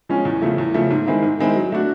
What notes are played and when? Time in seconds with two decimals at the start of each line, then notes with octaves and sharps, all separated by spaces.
0.09 F3 G#3 C#4
0.25 E2
0.42 C#3 F3 A3
0.58 E2
0.74 C#3 F3 A3
0.91 G#2
1.07 D#3 G#3 C4 E4
1.23 G#2
1.39 D#3 G#3 C4 E4
1.56 F#3
1.72 A3 D4 F#4